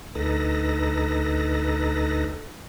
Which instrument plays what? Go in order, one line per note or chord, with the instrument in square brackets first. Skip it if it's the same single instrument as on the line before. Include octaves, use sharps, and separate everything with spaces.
[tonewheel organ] D2 D#4 A4 B4 A#6